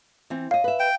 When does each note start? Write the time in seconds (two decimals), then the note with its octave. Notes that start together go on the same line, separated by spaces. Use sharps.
0.30 E3 C4
0.51 C#5 D#5 F5
0.64 B4 E5
0.80 G5